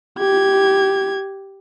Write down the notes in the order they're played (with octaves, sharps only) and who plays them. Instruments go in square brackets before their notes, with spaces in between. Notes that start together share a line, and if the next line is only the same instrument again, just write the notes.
[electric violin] G4 G#6